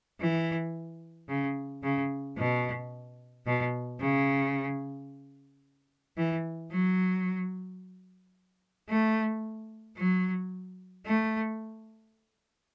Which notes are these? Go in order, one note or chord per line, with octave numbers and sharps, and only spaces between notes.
E3
C#3
C#3
B2
B2
C#3
E3
F#3
A3
F#3
A3